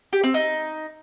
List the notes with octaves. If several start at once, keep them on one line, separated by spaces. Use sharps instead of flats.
G4
C4
D#4